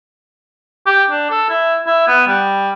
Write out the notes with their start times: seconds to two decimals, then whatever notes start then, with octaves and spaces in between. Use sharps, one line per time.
0.86 G4
1.10 D4
1.30 A4
1.49 E4
1.86 E4
2.07 B3
2.27 G3